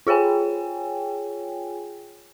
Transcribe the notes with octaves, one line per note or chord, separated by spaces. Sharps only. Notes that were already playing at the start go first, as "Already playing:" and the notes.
F4 G#4 C#5 G5 G#5